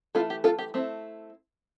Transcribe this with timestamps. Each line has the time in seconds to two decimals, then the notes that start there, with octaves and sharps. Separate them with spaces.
0.15 E3 A3 E4 F4 A4
0.30 G4
0.44 F4 A4
0.59 G4
0.74 A3 C4 E4